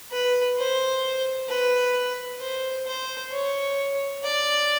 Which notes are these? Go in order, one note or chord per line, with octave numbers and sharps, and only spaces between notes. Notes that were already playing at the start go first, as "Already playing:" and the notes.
B4
C5
B4
C5
C5
C#5
D5